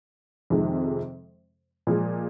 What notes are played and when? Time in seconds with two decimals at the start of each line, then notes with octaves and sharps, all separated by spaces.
0.50 F2 C3 D#3 G#3
1.87 A#2 F3 G#3